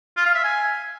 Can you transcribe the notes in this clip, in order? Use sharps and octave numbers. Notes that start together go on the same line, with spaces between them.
F4
F5
E5
G#5